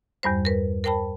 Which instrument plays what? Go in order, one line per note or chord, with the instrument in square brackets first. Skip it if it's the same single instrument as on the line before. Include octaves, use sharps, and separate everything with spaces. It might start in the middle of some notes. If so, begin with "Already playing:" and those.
[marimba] E2 G2 G3 C5
A#4 B4
A#4 C5 G5 A5 B5